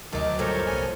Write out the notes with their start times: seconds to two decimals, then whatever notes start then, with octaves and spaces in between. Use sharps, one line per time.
0.13 D2 D#3 F#3 D#4 A5 D6
0.39 G2 A#2 F3 A4 A#4 C#5
0.67 C2 G#5